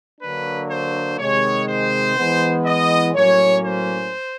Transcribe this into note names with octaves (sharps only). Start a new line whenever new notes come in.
D3 F#3 A#3 D4 B4
C5
C3 D#3 G#3 C#5
C5
E3 G#3 B3
D#5
A2 F#3 A#3 C#4 C#5
C5